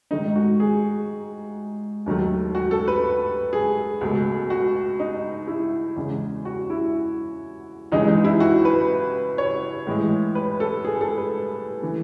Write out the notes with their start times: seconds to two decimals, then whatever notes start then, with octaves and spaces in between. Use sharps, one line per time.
0.11 G#2 D#3 A3 D#4
0.36 F#4
0.60 G#4
2.06 D#2 D#3 F#3 A3
2.55 F#4
2.71 A4
2.88 B4
3.53 G#4
4.01 C#2 B2 A3
4.50 F#4
5.00 D#4
5.47 E4
5.96 E2 C#3 G#3
6.45 F#4
6.70 E4
7.92 C#2 C#3 E3 G#3 D#4
8.08 D#4
8.24 E4
8.40 F#4
8.65 B4
9.38 C#5
9.87 A2 E3 G#3
10.35 B4
10.60 A4
10.85 G#4
11.01 A4
11.18 B4
11.82 E3 A3